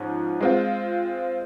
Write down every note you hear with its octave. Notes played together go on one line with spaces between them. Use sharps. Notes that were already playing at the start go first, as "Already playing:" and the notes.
Already playing: G#2 F3 C#4
G#3 C4 F4